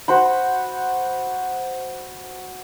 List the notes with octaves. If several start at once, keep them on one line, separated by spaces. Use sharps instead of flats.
F#4 C5 B5